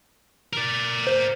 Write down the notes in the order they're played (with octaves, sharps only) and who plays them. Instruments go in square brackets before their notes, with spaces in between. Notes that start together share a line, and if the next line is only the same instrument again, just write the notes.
[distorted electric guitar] A#4 D5
[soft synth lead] C5